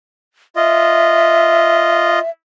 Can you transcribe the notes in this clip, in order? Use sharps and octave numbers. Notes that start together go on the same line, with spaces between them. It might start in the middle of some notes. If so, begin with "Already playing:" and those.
F4 D#5 E5